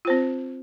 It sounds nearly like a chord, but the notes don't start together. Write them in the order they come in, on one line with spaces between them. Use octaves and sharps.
F4 C5 C4